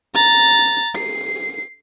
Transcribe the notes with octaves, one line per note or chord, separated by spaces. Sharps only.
A#5 A6
C7